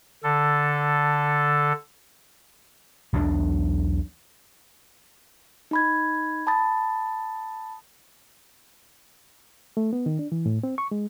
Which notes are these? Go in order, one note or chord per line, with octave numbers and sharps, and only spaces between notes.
D3 A4
B1 E2 B2 D4
D#4 B5 G#6
A5 B5 D#6 A6
A3
B3
D#3
D4
E3
A2
C4
C#6
G#3